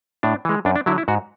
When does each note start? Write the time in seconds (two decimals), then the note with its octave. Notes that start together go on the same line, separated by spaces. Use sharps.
0.23 A2 D4
0.45 E3 G#3
0.65 F#2 D4
0.76 D4
0.86 D3 F#3 E4
0.98 E4
1.08 G#2 F#4